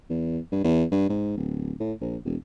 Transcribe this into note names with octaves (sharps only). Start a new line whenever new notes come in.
E2
G2
E2
G2
G#2
D1
A2
A#1
E1